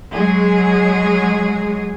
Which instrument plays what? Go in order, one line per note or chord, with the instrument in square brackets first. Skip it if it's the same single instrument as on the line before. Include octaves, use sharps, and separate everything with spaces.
[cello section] F#3 G#3 G#4